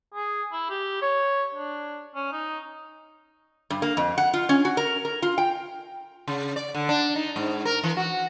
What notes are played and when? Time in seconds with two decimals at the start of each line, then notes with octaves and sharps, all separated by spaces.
0.14 G#4
0.52 E4
0.70 G4
1.02 C#5
1.55 D4
2.15 C#4
2.32 D#4
3.70 G2
3.82 A#3
3.97 F2
4.18 F#5
4.33 F4
4.49 C#4
4.65 F#4
4.77 A#4
5.05 A#4
5.22 F4
5.38 G5
6.28 C#3
6.56 D5
6.75 D3
6.89 D4
7.16 D#4
7.36 G#2
7.65 A#4
7.84 E3
7.97 F#4